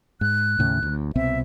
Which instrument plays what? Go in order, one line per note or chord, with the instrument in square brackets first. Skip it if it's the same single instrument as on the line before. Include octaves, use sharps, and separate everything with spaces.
[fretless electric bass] G#2 [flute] F#6
[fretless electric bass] D#2 A2 C#3
D2
[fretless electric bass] C2 B2 C4 [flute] E5